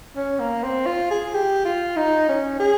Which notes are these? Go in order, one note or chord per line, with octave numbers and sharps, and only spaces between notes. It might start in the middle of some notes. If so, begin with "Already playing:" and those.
C#4
A#3
C4
F4
G#4
G4
F4
D#4
C#4
G#4